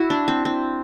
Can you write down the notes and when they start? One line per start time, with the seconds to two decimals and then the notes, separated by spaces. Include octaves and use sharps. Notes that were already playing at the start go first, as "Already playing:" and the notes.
Already playing: E4 F#4
0.10 D4
0.28 C4
0.45 C4